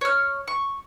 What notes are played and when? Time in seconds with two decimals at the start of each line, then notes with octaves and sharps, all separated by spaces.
0.01 C#5 F6
0.48 C#6